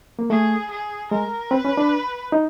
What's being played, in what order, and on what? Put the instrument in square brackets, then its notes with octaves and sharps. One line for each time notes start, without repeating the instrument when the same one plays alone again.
[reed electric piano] A#3
[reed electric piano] A3 [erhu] G#4
[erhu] G#4
[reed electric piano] G#3 [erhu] A#4
[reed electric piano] C4 [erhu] B4
[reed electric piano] C#4
D4
D#4